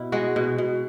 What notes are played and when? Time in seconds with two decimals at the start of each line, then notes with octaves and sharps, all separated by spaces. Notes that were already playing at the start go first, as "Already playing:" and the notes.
Already playing: B2 E4
0.12 G#3 F#4
0.36 B2
0.58 B2